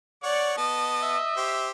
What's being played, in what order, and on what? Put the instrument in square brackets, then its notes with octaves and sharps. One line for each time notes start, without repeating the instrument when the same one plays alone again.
[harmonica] C#5 F#5 [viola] D5
[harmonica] B3 A5 [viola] D#5
[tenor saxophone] E5
[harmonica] G4 C5